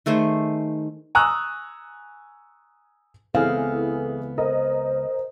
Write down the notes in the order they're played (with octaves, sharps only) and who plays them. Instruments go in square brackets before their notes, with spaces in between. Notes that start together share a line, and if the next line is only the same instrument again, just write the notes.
[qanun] D#3 A3 G#4 C5
[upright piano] G#5 A#5 C#6 D#6 E6 F#6
[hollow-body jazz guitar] C#2 B3 C4 [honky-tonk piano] E3 G#4 [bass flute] A4 [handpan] F5
[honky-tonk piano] A#4 D#5 [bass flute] C5